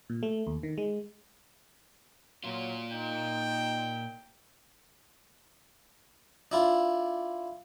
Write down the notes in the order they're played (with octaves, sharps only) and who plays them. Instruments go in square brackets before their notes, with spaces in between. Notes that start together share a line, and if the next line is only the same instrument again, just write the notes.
[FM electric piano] A#2
A3
D#2
D#3
G#3
[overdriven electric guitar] A#2 F4 [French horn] F#3
[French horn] D#4 [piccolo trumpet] G5
[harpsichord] D4 E4 F4